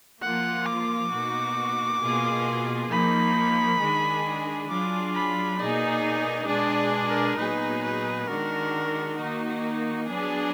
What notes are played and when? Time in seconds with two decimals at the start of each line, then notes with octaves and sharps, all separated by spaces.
0.22 F3 A#3 F4 F#5
0.66 D6
1.11 B2 A#3 D#4 F#4
2.01 B2 A#3 F4 G#4
2.90 F3 A#3 D#4 B5
3.81 D#3 G#3 D4 G#4
4.69 F#3 D4 F4 G#4 D6
5.15 B5
5.59 B2 A#3 D#4 G#4 D5
6.48 B2 G#3 D4 G#4 D5
7.08 A#4
7.38 A#2 F#3 B3 D#4 G#4 B4
7.83 B4
8.27 D#3 G#3 D4 F#4 A#4
9.17 D#3 A#3 D#4 F#4
10.06 F#3 B3 D4 G#4